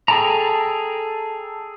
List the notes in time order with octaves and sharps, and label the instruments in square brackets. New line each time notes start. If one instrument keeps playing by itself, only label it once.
[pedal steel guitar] G#4 A4 G5 A5 A#5